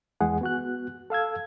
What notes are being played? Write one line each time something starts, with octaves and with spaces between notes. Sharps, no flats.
E2 E3 G#3 G#4 F#5
B3 F#4 F#6
A4 F5 E6 G#6